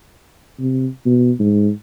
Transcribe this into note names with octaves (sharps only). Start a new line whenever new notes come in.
C3
B2
G#2